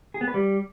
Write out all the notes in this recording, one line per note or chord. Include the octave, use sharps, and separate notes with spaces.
G#4
B3
B4
G3